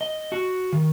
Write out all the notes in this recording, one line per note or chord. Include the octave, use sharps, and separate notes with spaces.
D#5
F#4
D#3